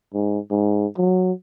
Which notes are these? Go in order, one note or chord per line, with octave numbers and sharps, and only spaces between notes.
G#2
G#2
F#3